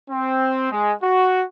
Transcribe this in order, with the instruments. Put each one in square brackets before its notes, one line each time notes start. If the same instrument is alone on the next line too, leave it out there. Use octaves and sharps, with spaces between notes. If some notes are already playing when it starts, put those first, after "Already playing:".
[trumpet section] C4
G#3
F#4